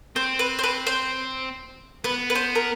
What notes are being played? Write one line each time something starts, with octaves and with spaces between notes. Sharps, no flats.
C4 C5
B4
C5
B4
C5
B3 B4
B4
C5
A#4